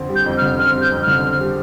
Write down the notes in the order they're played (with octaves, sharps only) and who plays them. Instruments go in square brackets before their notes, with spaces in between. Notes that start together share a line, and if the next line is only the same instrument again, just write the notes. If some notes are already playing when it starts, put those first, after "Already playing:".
Already playing: [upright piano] F2 D3 C4
G3
[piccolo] G6
[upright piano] F2
[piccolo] F6
[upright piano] D3
[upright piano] C4 [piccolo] F6
[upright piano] G3
[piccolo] G6
[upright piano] F2
[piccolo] F6
[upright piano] D3
C4
G3